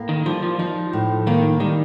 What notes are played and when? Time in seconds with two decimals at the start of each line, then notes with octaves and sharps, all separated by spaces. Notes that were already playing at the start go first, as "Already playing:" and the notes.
Already playing: A2 A#3
0.09 D#3
0.26 F3 G3
0.43 F3
0.59 F3 D#4
0.93 A2
1.27 D#3 A#3
1.60 D#3 G3